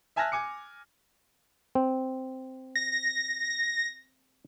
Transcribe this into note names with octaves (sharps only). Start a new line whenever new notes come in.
E5 G#5 A5 F6 F#6 A#6
G#5 D6 C#7
C4
A#6